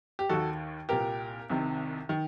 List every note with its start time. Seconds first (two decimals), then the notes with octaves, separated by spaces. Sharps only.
0.19 G4
0.29 D#2 D#3 F#4 A4
0.89 C2 A#2 G4 A#4
1.50 C2 C3 D#3
2.09 D#3